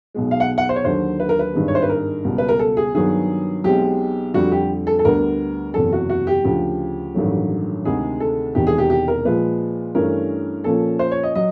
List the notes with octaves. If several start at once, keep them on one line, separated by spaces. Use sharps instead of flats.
B1 B2 G#3
F5
F#5
F#5
C5
C#5
D#2 D3 F#3 C5
B4
A#4
B4
G#1 G2 D#3 G#3
C#5
C5
B4
A#4
C#2 B2 G3
B4
A#4
A4
G#4
G2 D#3 F#3 B3 G#4
B1 B2 G#3 C4 G4
F2 D3 G3 F#4
G4
A4
A4
D2 D3 G3 B3 A#4
F#1 E2 C3 A4
F#4
F#4
G4
D2 C#3 F3 G4
A1 G2 D#3 F#3 A3
D2 C3 D#3 G#3 G#4
A4
E1 E2 C3 D#3 G#3 G4
G#4
G4
G4
A#4
A#2 F3 G#3 B4
G2 E3 A3 C#4 A#4
A#2 F3 A#3 C#4 A4
C5
C#5
D#5
F#3 D#5